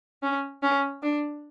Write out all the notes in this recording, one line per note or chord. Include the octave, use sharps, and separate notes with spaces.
C#4
C#4
D4